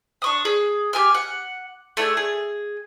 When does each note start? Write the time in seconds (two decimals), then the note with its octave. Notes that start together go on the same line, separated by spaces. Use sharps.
0.22 D4 C#6 D#6
0.45 G#4
0.93 G4 G#5 F6
1.14 F#5
1.97 A3 D4 E4 G#4
2.17 G#4